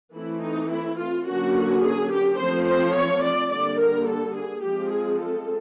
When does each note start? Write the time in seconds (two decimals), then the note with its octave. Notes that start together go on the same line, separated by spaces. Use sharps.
0.15 E3 A3 C4 E4
0.43 D#4
0.71 E4
0.99 F4
1.27 D3 F#3 A#3 C#4 F#4
1.84 G#4
2.12 G4
2.39 F3 A3 C4 C5
2.67 C5
2.95 C#5
3.23 D5
3.51 D3 G3 A#3 D5
3.80 A#4
4.07 A4
4.36 G#4
4.63 F3 G#3 C4 G4
4.91 G#4
5.20 A4